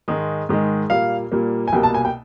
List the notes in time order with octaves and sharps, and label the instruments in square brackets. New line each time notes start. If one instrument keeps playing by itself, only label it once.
[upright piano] G#2 D#3 G#3
G#2 D#3 G#3
A#2 G3 A#3 F5
A#2 G3 A#3
G#5
C2 B2 G3 A#3 G5
A5
G#5
G5